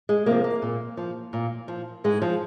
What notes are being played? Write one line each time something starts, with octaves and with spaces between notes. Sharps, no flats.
G#3
C3 F3 A#3
A#3
A#2
F3
A#2
F3
G#2 G#3
F3